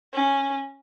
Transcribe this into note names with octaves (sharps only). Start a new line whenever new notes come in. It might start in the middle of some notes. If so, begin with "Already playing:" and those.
C#4